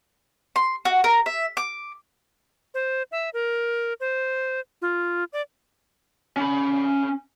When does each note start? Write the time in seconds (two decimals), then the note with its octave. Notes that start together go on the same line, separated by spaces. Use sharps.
0.56 C6
0.85 F#4
1.04 A#4
1.26 E5
1.57 D6
2.74 C5
3.12 E5
3.34 A#4
4.00 C5
4.82 F4
5.33 D5
6.37 C#4 B5